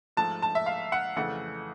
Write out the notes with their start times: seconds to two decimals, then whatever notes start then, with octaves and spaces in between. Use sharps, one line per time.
0.17 G#2 F3 A3 A5
0.42 A5
0.55 E5
0.66 F5
0.92 F#5
1.16 F2 C#3 E3 A3 F#5